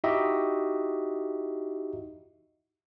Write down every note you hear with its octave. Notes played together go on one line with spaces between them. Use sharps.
D#4 E4 F#4 G4 D#5 E5